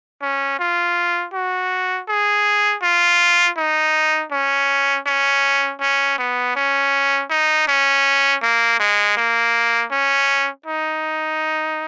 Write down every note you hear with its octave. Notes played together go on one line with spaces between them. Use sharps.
C#4
F4
F#4
G#4
F4
D#4
C#4
C#4
C#4
B3
C#4
D#4
C#4
A#3
G#3
A#3
C#4
D#4